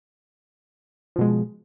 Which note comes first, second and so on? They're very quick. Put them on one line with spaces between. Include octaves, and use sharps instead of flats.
F3 B2 G#3